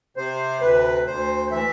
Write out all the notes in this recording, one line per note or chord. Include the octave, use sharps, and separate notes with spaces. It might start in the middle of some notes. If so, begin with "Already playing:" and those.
C3 C5
D2 B4
D2 C5
E3 E5